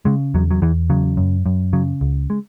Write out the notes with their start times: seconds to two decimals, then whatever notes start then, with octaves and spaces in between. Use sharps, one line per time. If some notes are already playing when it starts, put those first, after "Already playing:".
0.05 C#3 G#3
0.34 E2 F#3
0.51 F#3
0.62 E2 E3
0.90 C#3 F#3
1.17 F#2
1.46 F#2
1.73 C#3 F#3
2.01 C#2
2.30 G#3